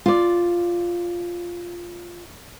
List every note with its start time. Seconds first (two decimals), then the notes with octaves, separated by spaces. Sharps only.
0.06 F4 D5